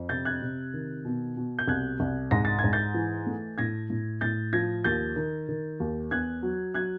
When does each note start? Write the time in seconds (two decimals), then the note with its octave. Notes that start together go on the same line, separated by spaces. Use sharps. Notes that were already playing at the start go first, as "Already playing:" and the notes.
Already playing: F2
0.09 C3 G6 A6
0.25 F#6 G#6
0.42 C3
0.74 D#3
1.05 B2
1.37 B2
1.59 G6
1.68 C2 F#6 G#6
2.00 C2
2.31 G#2 A#6
2.45 A6
2.59 G#6
2.64 G#2
2.73 G6 A6
2.94 E3
3.27 A3
3.58 A2 G#6 A#6
3.90 A2
4.21 A2 G6 A6
4.53 F3 G#6 A#6
4.84 D#2 G6 A6
5.16 D#3
5.49 D#3
5.80 D#2
6.11 E2 F#6 G#6
6.43 F#3
6.74 F#3 F#6 G#6